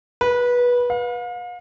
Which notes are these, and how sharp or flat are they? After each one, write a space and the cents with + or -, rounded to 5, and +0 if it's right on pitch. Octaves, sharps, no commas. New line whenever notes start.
B4 -20
F5 +40